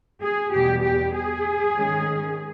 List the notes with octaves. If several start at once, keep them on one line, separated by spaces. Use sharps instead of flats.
G#4
E2 B2 G3 G4
G4
G#4
G#2 D#3 G#3 C#4